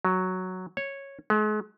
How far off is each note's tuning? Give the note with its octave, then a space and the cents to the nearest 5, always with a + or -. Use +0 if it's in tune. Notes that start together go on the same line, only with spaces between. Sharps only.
F#3 +0
C#5 -10
G#3 +40